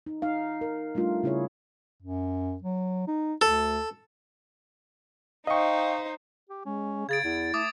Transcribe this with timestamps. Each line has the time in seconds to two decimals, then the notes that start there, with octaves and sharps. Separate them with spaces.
0.06 D#4
0.22 D#4 F5
0.61 A#4
0.95 G3 A3 D4 F4
1.23 C#3 C#4 E4 G#4 C#5
2.02 F#2
2.62 F#3
3.07 D#4
3.41 D2 A4
5.47 D#4 C5 D#5 F5 G5 C#6
6.50 G4
6.65 G#3 C#4
7.09 C#3 G#4 G#6 A6 D7
7.24 E2 E4
7.54 A3 D6 D#6